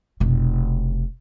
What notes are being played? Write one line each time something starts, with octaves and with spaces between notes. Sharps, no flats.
F1 B2